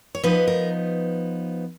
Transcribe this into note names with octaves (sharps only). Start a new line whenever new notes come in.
C#5
F3 B3 D#4 B4
A#4